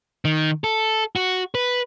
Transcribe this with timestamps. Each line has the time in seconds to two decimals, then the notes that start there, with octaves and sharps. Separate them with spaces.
0.25 D#3
0.64 A4
1.16 F#4
1.55 B4